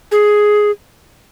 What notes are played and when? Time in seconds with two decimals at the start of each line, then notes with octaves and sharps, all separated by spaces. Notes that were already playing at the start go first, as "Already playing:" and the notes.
0.12 G#4